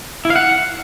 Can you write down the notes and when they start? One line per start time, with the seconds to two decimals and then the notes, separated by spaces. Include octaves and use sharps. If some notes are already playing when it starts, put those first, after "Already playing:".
0.25 E4
0.30 F5
0.36 F#5